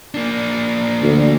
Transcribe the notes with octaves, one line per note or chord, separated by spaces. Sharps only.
A#3 D4
D2